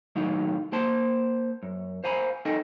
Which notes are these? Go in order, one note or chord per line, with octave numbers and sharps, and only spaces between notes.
B1 A2 D#3 F#3 D#4 F5
A#3 C5 A5 C6
F#2
C5 F5 G#5 A#5 B5
D#4 A4 D#5 G5 G#5